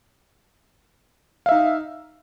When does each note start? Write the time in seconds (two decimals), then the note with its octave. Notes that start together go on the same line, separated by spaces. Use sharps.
1.46 F5
1.49 E5
1.51 D#4